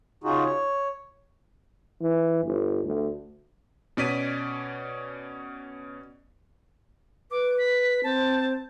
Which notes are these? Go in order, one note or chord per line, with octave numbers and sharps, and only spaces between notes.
C#3 D#4 F4 F#4 G#4
C#5
E3
G1
D2
B2 C#4 D5 B6 D#7
B4 D6
B6
C4 C5 A5